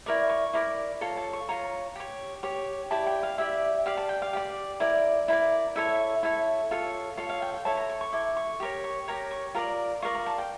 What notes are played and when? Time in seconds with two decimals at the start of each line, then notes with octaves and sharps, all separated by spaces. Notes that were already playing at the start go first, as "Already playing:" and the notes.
0.06 E4 A#4 D5 C#6
0.30 C#6
0.53 E4 A#4 D5 D6
1.01 F4 A4 C#5 A#5
1.17 A5
1.33 C#6
1.49 F4 A4 C#5 A#5
1.96 G4 C#5
2.43 G4 C#5
2.91 E4 G4 D5 A5
3.07 G5
3.23 F5
3.38 E4 G4 D5 E5
3.86 G4 D5 F5
3.97 A5
4.09 G5
4.22 F5
4.33 G4 D5
4.80 E4 A#4 D5
5.28 E4 A#4 D5
5.76 E4 A4 C#5 E5
6.23 E4 A4 C#5
6.71 F4 A4 C#5
7.17 F4 A4 C#5 F5
7.29 F5
7.42 G5
7.53 G5
7.65 E4 A4 C#5 A5
7.77 A#5
7.89 C#6
8.01 C#6
8.13 E4 A4 D6
8.37 C#6
8.60 G4 A#4 C#5
8.84 C#6
9.08 G4 A#4 C#5 A#5
9.31 C#6
9.55 F4 A#4 D5 A#5
10.02 F4 A#4 D5 C#6
10.15 A#5
10.26 A5
10.38 G5